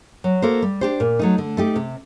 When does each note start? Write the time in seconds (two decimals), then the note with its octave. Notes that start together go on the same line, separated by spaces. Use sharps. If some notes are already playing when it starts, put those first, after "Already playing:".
0.24 F#3
0.42 A#3 F#4 A4 C5
0.62 G3
0.81 D4 G4 C5
1.00 A#2
1.19 F#3 A3 D#4
1.38 D3
1.57 A3 D#4 G4
1.76 C3